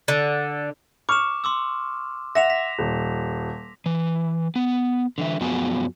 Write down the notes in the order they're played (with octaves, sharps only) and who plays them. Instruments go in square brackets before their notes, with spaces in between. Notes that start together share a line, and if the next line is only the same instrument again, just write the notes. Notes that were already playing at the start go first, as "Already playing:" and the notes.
[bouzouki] D3
[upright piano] C#6 F6 [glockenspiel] D6 E7
[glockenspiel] C6 D6 E6
[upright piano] E5 F#5 [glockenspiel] A#6 E7 F7
[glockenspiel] B6
[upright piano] D#1
[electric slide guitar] E3
B3
D3 E3 E5
F#2 F3 B3 F#4 G#4 G#5